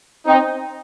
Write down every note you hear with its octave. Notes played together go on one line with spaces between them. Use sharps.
C4 D#4